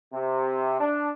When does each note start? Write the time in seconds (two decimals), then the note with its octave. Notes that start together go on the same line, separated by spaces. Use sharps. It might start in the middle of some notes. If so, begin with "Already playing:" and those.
0.13 C3
0.80 D4